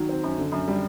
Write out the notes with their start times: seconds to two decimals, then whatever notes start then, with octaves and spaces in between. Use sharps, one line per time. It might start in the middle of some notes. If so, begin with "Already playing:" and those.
Already playing: D#3 F#3
0.09 C4
0.23 F#2
0.38 D3
0.52 F#2
0.68 G3